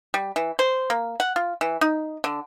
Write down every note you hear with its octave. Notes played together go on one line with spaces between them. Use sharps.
G3
E3
C5
A#3
F#5
F4
E3
D#4
D3